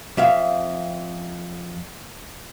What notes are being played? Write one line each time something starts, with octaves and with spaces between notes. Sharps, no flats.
F2 E5 F5